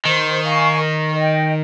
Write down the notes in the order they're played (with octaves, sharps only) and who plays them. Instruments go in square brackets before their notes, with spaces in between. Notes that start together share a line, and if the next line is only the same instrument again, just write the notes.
[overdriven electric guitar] D#3 [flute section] C5
[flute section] F5 G#5 C#6
A#4
D#5 G5